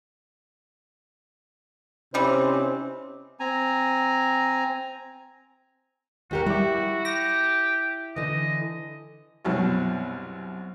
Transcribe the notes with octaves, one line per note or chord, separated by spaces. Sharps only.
C3 E3 G3 C#4 D#4 C5
C4 G#5 A#5
D#2 F#4 G4 A#4
G3 E4 G4
G4 A#6
D3 E3 D#5
C2 F#2 B2